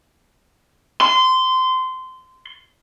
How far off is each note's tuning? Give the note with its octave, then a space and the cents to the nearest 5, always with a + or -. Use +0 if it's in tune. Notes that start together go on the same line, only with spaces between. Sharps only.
C6 -20